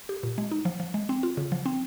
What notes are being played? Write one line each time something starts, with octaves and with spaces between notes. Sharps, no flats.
G4
A#2
G#3
D#4
F3
F3
G#3
C4
F4
C#3
F3
C4